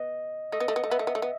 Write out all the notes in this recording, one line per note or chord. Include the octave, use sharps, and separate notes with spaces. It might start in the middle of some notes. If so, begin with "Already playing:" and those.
Already playing: B3 D#5
A3 D#5
B3
A3
B3
A3
B3 E5
A3
B3
A3
B3